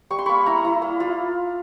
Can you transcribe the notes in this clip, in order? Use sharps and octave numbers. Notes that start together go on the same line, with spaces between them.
G3 C#6
C6
A#3 B5 C#6
E4 A#5 C6
E4
A#3
F4